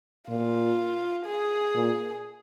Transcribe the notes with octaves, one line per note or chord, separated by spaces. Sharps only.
A#2 F4
G#4
A#2